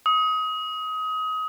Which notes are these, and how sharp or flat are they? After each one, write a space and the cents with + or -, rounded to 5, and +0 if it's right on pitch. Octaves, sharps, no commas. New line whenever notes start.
D#6 +25